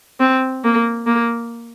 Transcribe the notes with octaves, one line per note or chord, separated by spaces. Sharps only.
C4
A#3
A#3